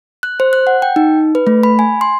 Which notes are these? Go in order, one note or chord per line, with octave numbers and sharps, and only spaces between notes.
F#6
C5
F#6
F#5
G5
D#4
B4
A3
B5
G#5
C6